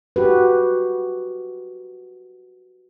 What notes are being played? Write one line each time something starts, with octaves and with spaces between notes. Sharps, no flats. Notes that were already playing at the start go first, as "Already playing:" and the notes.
F#4 G4 B4